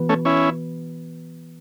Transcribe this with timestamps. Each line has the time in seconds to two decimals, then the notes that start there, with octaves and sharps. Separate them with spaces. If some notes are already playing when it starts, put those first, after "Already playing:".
Already playing: E3 B3 F#4 B4
0.09 A3 C#4
0.25 C#4 E4